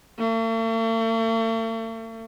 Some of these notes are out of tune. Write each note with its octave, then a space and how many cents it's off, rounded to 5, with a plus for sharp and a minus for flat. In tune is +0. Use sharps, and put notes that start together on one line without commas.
A3 +45